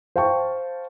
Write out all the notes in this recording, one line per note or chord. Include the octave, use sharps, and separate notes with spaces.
C5 F5 G5 A5 C#6